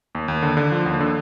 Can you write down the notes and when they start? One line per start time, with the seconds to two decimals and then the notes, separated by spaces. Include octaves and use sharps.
0.15 D#2
0.28 D#2
0.42 D3
0.57 D3
0.72 F3
0.86 D#2
1.00 D3